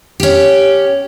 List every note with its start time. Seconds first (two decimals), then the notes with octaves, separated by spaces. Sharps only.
0.20 C#4 G4